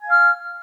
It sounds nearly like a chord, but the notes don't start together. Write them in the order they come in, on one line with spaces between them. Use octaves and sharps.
G#5 F5 F6